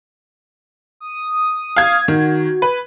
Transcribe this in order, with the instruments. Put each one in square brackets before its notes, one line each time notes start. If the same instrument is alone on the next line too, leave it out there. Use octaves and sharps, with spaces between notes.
[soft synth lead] D#6
[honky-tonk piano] F5 G#6
[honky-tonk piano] D#3 [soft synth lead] F#4
[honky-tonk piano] B4